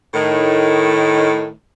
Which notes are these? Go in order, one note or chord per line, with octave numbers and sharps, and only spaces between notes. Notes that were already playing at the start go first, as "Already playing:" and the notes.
A2 D#3